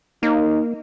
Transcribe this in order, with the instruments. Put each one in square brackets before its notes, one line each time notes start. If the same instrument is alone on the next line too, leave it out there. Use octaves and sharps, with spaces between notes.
[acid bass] A#3 [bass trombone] D#4